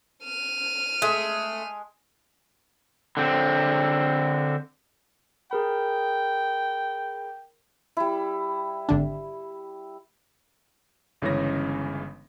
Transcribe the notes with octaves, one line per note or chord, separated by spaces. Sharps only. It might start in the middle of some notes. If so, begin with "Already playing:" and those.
F6 D#7
G#3 A3
D3 C4
G#4 A#4 G5 B5
G3 E4
G#1 D3 D4
G1 C#3 E3 G#3 C#4 A#6